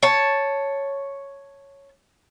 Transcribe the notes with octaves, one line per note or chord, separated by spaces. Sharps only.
C#5 A5